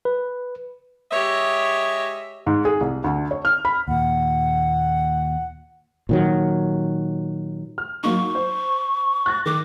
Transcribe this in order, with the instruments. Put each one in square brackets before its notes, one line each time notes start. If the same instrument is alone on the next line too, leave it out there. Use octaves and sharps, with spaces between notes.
[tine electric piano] B4
[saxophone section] G#3 D#5 E5 [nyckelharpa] G4 C#5
[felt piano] G#2
G#4
C2
D2
C#5
F6
B5
[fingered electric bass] D#2 A#2 [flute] F#5
[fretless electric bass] A#2 D#3 F#3
[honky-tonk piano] F6
[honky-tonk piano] F#3 A#3 D#4 [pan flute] C#6
[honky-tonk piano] C5
F#6 A6 A#6
[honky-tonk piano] D#3 [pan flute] D6